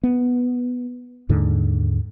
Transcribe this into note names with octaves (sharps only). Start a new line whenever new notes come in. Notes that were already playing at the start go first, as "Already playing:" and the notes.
B3
D#2 G#2 D3